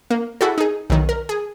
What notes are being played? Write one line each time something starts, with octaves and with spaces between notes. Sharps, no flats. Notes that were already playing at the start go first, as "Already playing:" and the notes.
A#3
E4 F#4 G#4 A4
D#4 G#4
B1 D#3
A#4
G#4